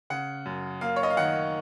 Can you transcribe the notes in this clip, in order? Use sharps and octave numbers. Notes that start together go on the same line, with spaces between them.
C#3 F#5
F#2
A#3 F5
C#5
D#5
F5
D#3 F#5